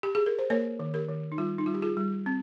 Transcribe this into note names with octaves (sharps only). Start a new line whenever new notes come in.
G4
G#4
A#4
C5
A#3 A#4 C#5
D#3
G4 A#4
D#3
D#4
G3 F4
D#4
G3 F4
G4
F4 G#4
G3
C4